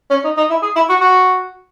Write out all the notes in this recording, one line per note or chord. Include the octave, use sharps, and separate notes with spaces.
C#4
D#4
D#4
E4
G#4
E4
F#4
F#4